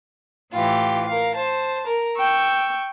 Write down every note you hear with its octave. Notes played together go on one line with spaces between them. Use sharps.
A2 E3 F4 G4
A#4 F5
C5 A5
A#4
G5 C#6 E6